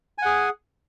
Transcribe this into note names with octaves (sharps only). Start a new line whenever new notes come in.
G#4 F#5 G#5